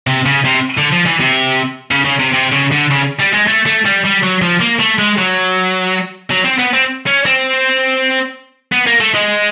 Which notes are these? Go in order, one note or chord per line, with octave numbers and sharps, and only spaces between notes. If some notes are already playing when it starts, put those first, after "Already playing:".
C3
C#3
C3
D3
F3
E3
C3
C#3
C#3
C3
C3
C#3
D3
C#3
G3
G#3
A3
A3
G3
G3
F#3
F3
A#3
A3
G#3
F#3
F#3
C4
B3
C4
C#4
C4
B3
A#3
A3
G#3